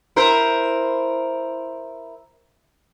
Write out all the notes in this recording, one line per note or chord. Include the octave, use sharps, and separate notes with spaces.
E4 A#4 C5